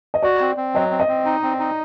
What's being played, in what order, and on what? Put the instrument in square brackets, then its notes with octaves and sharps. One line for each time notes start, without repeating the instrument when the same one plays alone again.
[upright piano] D#5
[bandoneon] F#4 [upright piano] D5
[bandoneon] C4
C4
[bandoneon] F#3 [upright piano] D#5
[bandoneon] C4
[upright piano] D#5
[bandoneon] C4
D#4
C4
D#4